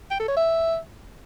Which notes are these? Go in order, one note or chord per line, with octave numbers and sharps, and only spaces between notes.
G5
A4
C#5
E5